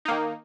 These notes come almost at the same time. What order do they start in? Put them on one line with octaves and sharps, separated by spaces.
D#4 A#3 D#3